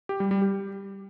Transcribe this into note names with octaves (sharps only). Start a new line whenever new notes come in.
G4
G3
G3
G4